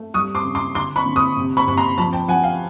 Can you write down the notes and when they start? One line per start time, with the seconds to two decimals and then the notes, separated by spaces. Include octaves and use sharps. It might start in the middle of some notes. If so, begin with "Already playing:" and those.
Already playing: A3
0.14 G3 C#6 D#6
0.35 C6 D6
0.45 C#3
0.55 C6 D6
0.75 D3 C6 D6
0.96 B5 C#6
1.06 D3
1.16 C#6 D#6
1.37 C3
1.57 B5 C#6
1.67 C3 C#6
1.77 A#5 C6
1.98 F3 A5 B5
2.13 G5 A5
2.28 F3 F#5 G#5
2.43 F5 G5